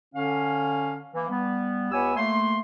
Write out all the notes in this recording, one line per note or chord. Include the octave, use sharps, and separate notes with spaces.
D3 C#4 F5
E3 A#3
G3 B3
C#2 B3 G4 C#5 G#5 E6
A3 A#3 C6